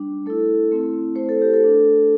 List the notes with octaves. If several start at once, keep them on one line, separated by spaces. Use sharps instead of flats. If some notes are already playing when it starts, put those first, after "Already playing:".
Already playing: G3 D4
A3 E4 A4
A3 C4 E4
A3 E4 C5
A4
G4
A4
A3 D4